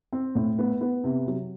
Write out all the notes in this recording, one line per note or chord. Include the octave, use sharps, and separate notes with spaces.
C4
A2
B3
B3
C3
F#3